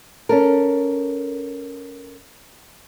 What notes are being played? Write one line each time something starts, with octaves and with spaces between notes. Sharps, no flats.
C#4 A4 A#4